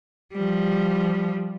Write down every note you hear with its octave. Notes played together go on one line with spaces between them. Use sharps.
F3 G3